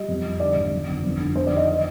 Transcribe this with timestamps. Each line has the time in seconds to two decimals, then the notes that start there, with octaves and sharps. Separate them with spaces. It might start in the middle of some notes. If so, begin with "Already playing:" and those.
Already playing: G3 D#5
0.08 F2
0.24 G3
0.40 D3 D5
0.56 G#1
0.73 F2
0.88 G1
1.04 F2
1.20 D3
1.35 F2 C5
1.46 D5
1.51 D#3
1.56 D#5
1.67 D#5